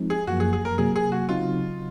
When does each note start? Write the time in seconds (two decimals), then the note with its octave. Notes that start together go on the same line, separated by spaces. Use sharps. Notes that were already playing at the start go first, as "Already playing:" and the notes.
Already playing: F3 G#3 C4 D#4
0.10 G#4
0.27 F#2 F3 A#3 F#4
0.40 G#4
0.53 G#4
0.65 A#4
0.78 C3 F#3 A#3 G#4
0.96 G#4
1.12 F#4
1.29 C#3 F#3 C4 D#4 F4 F#4